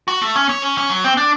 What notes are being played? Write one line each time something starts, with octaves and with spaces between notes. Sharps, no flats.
F#4
A3
C#4
C#5
C#4
C#4
F#3
C4
D4